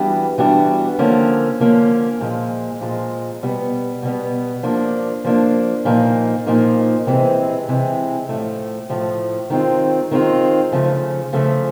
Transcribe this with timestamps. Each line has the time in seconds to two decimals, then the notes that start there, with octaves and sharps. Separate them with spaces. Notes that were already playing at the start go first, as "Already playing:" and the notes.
Already playing: E3 G3 B3 D4 F#4
0.38 E3 G3 B3 D4 F#4
0.99 D3 F3 A#3 C#4
1.60 D3 F3 A#3 C#4
2.20 A#2 F3 G#3
2.81 A#2 F3 G#3
3.42 B2 G3 B3
4.02 B2 G3 B3
4.63 F3 A#3 D4
5.25 F3 A#3 D4
5.85 A#2 F3 A#3 D#4
6.46 A#2 F3 A#3 D#4
7.06 C3 E3 G#3 C4
7.68 C3 E3 G#3 C4
8.29 A2 F3 A3
8.90 A2 F3 A3
9.50 D#3 G#3 C4 F4
10.11 D#3 G#3 C4 F4
10.72 C#3 F3 A3
11.33 C#3 F3 A3